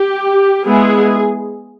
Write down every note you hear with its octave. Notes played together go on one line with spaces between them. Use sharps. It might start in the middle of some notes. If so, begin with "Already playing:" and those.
Already playing: G4
G#3 B3 E4 G#4